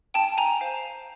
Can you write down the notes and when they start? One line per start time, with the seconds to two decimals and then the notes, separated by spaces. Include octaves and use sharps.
0.14 G5 A5
0.38 G#5 A#5
0.61 C5 F5